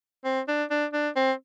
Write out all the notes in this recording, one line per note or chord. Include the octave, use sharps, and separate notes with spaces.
C4
D4
D4
D4
C4